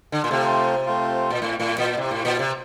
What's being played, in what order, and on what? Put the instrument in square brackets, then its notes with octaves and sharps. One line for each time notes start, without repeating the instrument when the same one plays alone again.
[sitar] D3
A#2
[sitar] C3 [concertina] A3 C4 F4
[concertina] A3 C4 F4
[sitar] A#2
[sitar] A2 [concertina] A3 C4 F4
[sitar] A2
A#2
[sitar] C3 [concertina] E4 G4 C5
[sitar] A2
A#2
C3